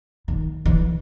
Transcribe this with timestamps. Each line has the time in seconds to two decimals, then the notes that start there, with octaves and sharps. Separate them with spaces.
0.28 D#3
0.66 E3